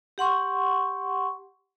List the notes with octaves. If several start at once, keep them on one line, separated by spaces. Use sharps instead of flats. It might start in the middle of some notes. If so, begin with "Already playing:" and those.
G4 F#5 C6 C#6